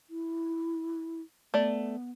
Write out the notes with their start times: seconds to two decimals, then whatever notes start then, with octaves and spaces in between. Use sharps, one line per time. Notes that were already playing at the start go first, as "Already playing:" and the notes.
0.10 E4
1.54 A3 B3 D5